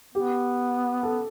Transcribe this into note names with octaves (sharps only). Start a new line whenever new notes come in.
B3 G4
A4